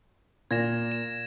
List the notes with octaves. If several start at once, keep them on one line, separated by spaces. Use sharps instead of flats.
A#2 G#6 A#6 E7
E7